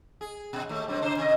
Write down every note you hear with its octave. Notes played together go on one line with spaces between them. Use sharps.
G#4
B2
D#2 A3
F#2 B2 C4
C#3 D#4 C5
C3 D#3 D#5